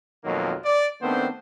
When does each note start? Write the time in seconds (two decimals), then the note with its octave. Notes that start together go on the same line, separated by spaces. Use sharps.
0.25 F2 B2 D#3 F#3 A#3
0.64 D5
1.02 D#3 A3 B3 C4 D4 C5